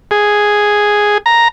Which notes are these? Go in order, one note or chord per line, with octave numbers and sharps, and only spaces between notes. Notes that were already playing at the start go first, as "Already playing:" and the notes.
G#4
A#5